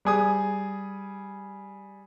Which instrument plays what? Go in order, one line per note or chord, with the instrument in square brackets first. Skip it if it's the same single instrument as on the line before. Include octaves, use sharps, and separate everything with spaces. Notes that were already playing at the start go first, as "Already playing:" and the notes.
[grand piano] G3 G#4 D#6